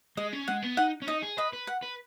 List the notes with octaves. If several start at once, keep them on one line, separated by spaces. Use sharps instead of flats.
G#3 D#5
C#4
G#3 F#5
B3
D#4 F#5
C#4
D#4 D#5
G#4
B4 D#5
B4
F#5
B4